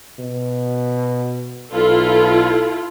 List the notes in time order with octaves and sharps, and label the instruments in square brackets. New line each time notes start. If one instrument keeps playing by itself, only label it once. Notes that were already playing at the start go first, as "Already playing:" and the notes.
[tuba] B2
[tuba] B1 [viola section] E4 F4 A4